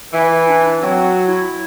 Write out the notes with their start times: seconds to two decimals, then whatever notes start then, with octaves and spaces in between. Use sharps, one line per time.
0.13 E3 B4
0.30 E4
0.48 D4
0.65 D4
0.82 F#3 C4
1.28 E4